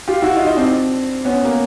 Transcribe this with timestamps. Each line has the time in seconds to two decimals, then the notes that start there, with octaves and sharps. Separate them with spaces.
0.08 F4 G4
0.22 E4 F#4
0.37 D#4 F4
0.47 D#4 F4
0.57 C4 D4
1.25 B3 C#4
1.45 A#3